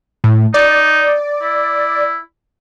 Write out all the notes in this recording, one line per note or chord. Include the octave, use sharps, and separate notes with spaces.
A2
D#4 D5
E4